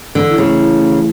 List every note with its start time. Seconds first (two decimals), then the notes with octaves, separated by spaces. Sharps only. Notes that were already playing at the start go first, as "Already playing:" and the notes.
0.15 D3 E3
0.31 E4
0.38 C#3
0.45 A3
0.61 E4
0.75 A3
0.91 E3